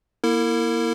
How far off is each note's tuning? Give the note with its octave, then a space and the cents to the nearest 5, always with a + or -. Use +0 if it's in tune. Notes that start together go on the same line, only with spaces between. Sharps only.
A#3 +30 E4 +0 A#4 -40